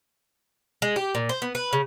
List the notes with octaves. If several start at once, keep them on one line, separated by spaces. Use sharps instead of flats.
G#3
G4
A#2
C5
B3
B4
C#3